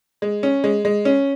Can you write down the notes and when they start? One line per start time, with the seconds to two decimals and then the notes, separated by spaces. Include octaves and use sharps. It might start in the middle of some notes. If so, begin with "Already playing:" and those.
0.22 G#3
0.43 C#4
0.64 G#3
0.85 G#3
1.05 C#4